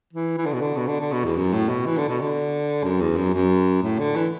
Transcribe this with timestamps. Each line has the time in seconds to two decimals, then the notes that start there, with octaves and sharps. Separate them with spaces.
0.13 E3
0.38 E3
0.46 D3
0.53 B2
0.61 D3
0.77 B2
0.87 D3
1.00 D3
1.12 B2
1.25 E2
1.37 F#2
1.53 A2
1.69 B2
1.86 E3
1.97 D3
2.09 B2
2.21 D3
2.84 F#2
3.01 E2
3.17 F#2
3.34 F#2
3.83 A2
3.99 D3
4.16 E3